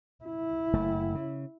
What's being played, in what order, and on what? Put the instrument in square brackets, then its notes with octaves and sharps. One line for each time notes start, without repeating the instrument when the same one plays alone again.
[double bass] E4
[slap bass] F#1 A3
C#3